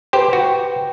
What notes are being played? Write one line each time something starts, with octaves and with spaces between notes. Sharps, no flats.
G4 B4 C5 G5
F#4